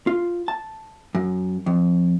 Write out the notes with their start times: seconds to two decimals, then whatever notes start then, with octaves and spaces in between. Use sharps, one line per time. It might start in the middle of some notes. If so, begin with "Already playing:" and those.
0.07 F4
0.48 A5
1.15 F#2
1.66 F2